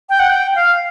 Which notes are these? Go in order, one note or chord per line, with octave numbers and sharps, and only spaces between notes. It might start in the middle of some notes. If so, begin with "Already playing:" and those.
G5
F#5
G5
F5